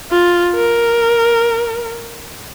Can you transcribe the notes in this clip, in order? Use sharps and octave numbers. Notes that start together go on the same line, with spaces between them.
F4
A#4